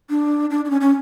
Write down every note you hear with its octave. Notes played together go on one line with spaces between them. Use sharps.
D4
D4
D4
C#4
C#4